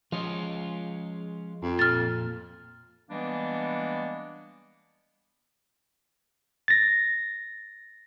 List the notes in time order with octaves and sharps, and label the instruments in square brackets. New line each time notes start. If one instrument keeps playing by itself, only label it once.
[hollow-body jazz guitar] F3 D#5 [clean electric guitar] G#3 C#4 F4
[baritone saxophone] F2
[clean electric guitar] A#2 [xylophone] F6 A6
[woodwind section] E3 G3 G#3 A#3 B3 D4
[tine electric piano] A6 A#6